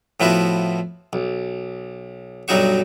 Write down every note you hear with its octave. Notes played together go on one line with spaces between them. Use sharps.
A2 F3 B3 E4 F#4
B1
B1 G2 F#3 D#4 F#4 C#6